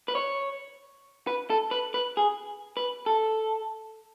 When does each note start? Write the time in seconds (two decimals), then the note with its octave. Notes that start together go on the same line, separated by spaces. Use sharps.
0.08 B4
0.15 C#5
1.27 B4
1.50 A4
1.71 B4
1.94 B4
2.17 G#4
2.77 B4
3.06 A4